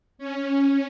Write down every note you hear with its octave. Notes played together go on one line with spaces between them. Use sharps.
C#4